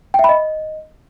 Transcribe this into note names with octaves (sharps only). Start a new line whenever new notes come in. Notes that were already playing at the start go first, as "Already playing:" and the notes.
G5
E5
B5
D#5